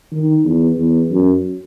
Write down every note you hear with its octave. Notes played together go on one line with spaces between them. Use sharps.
D#3
E2
E2
F#2